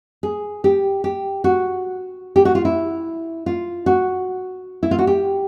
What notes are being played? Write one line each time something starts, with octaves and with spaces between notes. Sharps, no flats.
G#4
G4
G4
F#4
G4
F#4
F4
E4
F4
F#4
E4
F4
F#4
G4